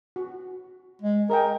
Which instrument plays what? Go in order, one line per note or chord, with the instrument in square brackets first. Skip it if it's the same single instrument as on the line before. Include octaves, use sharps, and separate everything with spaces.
[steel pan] F#4
[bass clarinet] G#3
[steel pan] G#4 D#5 G5 [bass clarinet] A#4